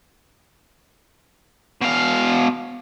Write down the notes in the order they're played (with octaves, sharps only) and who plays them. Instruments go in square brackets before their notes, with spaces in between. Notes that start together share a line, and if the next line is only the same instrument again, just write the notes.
[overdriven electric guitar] B2 F5